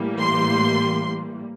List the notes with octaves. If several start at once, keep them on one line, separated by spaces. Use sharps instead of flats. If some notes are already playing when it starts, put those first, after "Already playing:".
Already playing: A2 E3 G3 A#3
C6